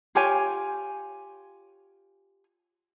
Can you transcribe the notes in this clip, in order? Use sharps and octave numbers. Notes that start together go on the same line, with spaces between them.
F4 G4 C#5 G#5